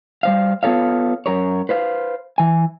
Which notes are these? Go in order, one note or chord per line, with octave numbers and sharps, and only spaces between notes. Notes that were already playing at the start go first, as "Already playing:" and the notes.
G3 C5 F5
B3 F4 A4 C#5 F5
F#2 A#4 C#5
B4 C5 F5
E3 G#5